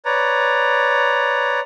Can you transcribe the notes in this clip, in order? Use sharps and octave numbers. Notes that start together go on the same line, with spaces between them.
B4 C#5 D5 A#5